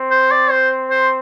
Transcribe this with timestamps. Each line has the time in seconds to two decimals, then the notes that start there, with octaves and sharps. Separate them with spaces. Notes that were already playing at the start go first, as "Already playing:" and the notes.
Already playing: C4
0.11 C5
0.31 D5
0.51 C5
0.91 C5